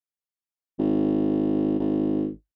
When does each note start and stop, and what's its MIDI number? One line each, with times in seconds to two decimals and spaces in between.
0.79 1.75 32
1.80 2.29 32